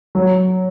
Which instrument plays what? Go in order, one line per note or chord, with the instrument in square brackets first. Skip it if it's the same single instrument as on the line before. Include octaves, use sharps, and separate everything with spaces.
[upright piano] F#3